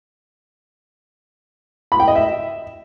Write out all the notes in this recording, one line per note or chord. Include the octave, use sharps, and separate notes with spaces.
B5
G5
D#5
E5